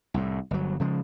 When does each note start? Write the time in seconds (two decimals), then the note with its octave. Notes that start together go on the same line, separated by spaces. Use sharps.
0.14 C2 A2
0.51 G1 F#3
0.80 C#3 F3 G#3